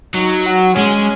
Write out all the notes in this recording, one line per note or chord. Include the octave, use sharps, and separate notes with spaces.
F#3 D#4
F#4
G#3 C#4